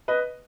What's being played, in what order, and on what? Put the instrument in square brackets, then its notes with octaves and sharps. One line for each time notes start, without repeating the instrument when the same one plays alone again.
[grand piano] B4 D#5